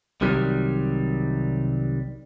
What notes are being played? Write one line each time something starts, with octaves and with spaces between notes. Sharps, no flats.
C2 C3 D#3 F#3 G3